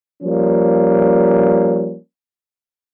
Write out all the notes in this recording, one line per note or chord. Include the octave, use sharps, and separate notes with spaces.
F3 G3 A#3 C#4